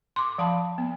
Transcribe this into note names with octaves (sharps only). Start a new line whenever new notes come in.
C6 D6
F3 F5 A5 B5
B3